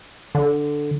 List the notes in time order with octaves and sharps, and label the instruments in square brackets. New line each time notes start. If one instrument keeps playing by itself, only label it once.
[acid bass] D3